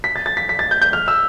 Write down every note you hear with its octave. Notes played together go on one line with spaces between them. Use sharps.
B6
A6
A6
B6
B6
A6
G6
G6
F6
E6